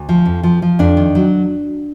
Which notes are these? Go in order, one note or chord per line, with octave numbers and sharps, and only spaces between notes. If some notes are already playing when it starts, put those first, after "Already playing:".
Already playing: D2
F3
F2
F3
F3
F2 D4
D#3
F#3